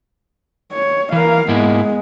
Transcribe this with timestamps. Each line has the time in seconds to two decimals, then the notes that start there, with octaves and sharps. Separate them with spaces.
0.72 C#5
1.12 E3 A#4 F5
1.48 G#2 G#3 A#3 B3 E4